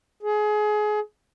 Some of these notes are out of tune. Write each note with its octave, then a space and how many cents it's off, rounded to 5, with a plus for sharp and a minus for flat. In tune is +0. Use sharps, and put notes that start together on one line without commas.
G#4 +25